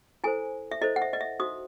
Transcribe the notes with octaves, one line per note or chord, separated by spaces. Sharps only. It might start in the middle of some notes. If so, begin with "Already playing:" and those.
E4 A4 C5 G#5
E5
E4 A4 C5 D#5
F#5
E5
D#5
E5
D#4 F#4 C5 D#6